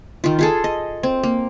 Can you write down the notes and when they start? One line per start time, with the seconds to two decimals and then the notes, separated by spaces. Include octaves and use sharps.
0.24 D#3 F4
0.39 F4 G#4 A4
0.64 D#5
1.03 C4
1.23 A#3